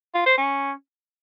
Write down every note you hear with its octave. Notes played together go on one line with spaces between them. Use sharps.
F4
C5
C#4